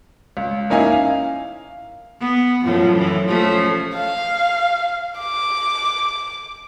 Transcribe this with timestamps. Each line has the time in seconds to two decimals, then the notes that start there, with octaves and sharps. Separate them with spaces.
0.37 C#2
0.70 A#3 C#4 D#4 E4 F5 G#5
0.92 F5
2.20 B3
2.64 F#2 A2 F3
2.97 E3
3.27 F3 A3 C#4
3.95 F5
5.18 D6